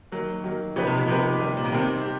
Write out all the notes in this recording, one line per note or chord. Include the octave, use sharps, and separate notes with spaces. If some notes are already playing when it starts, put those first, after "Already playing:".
D#3 F#3 A#3
D#3 F#3 A#3
C#3 F3 A#3 D#4 G4 B4
C3
B2
C3 F3 A#3 D#4 G4 B4
D#3 G3 C4
A#2
B2
C3 D#3 G3 C4
G4